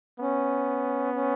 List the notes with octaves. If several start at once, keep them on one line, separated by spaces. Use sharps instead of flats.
B3 C#4
C#4